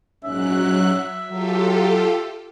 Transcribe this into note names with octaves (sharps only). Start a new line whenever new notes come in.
A#1 G#2 F#3 C#4 E5 F#6
F#3 F4 G4 A4